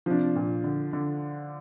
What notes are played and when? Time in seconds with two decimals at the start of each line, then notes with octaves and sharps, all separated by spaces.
0.06 C3 F3 D4
0.36 A#2
0.64 D3
0.93 D3